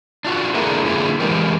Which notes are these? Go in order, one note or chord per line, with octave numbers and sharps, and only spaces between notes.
D4 F4 F#4
A3 A#3 D4 E4 G#4 A#4
D3 A#3 E4 F4 G#4
E3 G#3 C4 G4 A#4